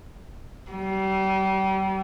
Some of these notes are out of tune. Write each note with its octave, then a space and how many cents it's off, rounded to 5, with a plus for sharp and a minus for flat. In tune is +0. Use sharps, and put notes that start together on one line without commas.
G3 -35